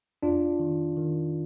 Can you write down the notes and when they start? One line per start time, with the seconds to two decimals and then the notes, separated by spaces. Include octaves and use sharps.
0.23 F2 D4 F4
0.60 D#3
0.97 D#3